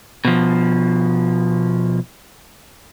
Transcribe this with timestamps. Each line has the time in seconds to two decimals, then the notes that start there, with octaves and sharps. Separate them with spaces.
0.25 B2 F3